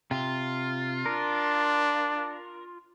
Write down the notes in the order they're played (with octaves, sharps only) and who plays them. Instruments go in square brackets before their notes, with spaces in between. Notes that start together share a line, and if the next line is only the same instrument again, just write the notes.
[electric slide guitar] C3 [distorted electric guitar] F4
[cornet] D4 [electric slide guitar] A#4